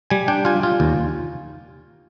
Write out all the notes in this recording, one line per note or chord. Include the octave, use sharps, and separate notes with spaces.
G3 G#5
D4 G5
F4 G#5
F4
D#2